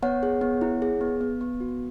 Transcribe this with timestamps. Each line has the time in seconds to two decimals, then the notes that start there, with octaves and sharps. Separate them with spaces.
0.03 B3 C#5 F#5
0.23 G#4
0.41 B3
0.61 E4
0.82 G#4
1.01 B3
1.21 B3
1.41 B3
1.60 F#4